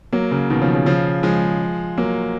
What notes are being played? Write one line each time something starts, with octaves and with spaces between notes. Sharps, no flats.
F#3 A#3
C#3
B2 D#3
C#3 F3
C#3
C#3 F3
F3 G#3
F#3 A#3